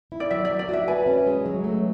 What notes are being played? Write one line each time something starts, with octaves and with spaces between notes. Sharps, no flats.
E4
D5
F#3 E5
D5
F#3
D5
F#4 E5
B4 G#5
C#4
G#3
F#3
A3